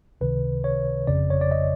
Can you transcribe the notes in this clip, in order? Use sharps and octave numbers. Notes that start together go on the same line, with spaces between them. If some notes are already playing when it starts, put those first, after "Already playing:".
C#2 C3 D#3 B4
C#5
G1 F2 C#3 D5
C#5
D5
D#5